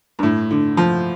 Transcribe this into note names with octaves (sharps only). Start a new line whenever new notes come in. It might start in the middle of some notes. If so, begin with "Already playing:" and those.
G2
A2
D3
F3